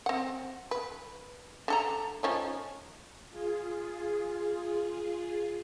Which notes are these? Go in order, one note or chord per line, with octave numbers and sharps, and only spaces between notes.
C4 F#5
B4
D3 A4 A#5
F3 C#4 D#4
F4 G#4